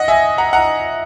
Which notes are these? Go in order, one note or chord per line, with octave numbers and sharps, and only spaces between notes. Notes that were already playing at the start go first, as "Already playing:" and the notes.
Already playing: D#5 F#5
E5 G#5
F#5 A#5
F#5 A#5